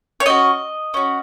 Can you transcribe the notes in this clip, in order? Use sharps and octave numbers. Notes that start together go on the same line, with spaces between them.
C#5
C#4 F#4 D#5
C#4 F#4